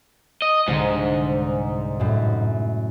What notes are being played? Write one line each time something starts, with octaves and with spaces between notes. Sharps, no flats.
D#5
C2 G#2 D3
F#2 A2